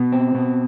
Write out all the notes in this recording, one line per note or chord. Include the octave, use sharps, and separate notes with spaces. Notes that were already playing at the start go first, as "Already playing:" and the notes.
Already playing: B2
C4
B2